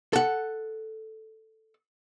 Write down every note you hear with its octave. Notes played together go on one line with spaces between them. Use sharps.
A4 F#5